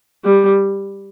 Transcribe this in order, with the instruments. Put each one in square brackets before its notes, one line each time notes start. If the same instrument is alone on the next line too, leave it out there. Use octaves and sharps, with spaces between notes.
[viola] G3